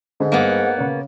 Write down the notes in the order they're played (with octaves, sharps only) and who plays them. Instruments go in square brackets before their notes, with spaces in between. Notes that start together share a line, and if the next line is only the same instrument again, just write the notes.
[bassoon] G#2 [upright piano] D3
[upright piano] G2 [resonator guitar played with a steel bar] A#3 B3 [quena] F#5
[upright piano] C#3 C#4